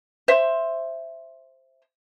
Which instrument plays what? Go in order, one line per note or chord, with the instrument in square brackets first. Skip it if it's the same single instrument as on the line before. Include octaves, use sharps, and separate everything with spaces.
[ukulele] C5 E5